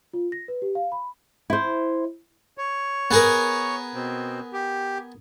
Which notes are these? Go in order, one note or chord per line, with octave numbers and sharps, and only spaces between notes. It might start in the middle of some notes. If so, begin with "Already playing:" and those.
F4
A#6
B4
G4
F5
B5
E4 C5
C#5
B3 G#4 A#4
B2 C4
G4